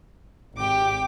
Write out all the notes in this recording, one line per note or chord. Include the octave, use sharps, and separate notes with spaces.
G#1 G4 G5 D6